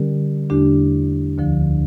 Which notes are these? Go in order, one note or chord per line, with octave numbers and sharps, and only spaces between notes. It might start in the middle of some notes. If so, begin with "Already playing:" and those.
Already playing: D3 G3 C#4 G4 A#4
E2 D3 A3 D4 G4
D2 D3 F3